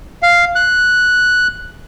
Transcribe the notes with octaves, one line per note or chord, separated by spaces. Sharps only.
F5
F#6